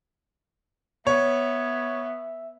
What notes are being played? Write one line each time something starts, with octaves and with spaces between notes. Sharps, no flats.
B3 C#5 E5